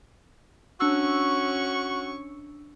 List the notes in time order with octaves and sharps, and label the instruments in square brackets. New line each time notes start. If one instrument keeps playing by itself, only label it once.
[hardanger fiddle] C#4 C#6 [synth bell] D4 E6 [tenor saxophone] F#4